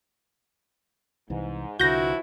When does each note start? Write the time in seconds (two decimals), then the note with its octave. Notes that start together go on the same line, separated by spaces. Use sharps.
1.30 C2 G#2 E3
1.80 C2 D3 E3 F3 E4 F#4 G6 A#6